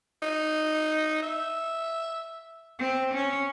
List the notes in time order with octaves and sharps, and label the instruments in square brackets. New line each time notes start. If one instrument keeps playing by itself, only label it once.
[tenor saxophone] D#4
E5
[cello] C4
C#4